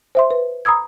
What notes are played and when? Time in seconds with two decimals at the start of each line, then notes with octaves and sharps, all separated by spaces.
0.15 C5 E5 C6
0.31 B4
0.65 A#5 B5 D#6 E6 G#6